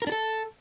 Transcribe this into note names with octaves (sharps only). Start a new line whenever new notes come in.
A#4
D4
A4